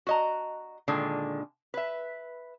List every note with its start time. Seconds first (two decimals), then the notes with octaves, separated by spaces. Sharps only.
0.07 F#4 D#5 A#5
0.88 A#2 D3 D#3 G#3
1.74 B4 E5